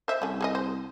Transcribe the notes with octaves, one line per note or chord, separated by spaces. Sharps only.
C5 E5
C2 A3 C#4
G#4 A4 D#5
C5